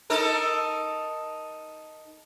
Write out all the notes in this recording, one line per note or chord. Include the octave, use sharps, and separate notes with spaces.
D#4 A4 A#4